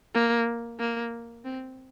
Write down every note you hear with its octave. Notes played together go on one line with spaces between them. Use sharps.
A#3
A#3
C4